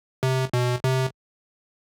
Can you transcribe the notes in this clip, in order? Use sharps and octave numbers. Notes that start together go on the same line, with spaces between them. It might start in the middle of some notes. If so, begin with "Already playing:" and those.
C3
B2
C3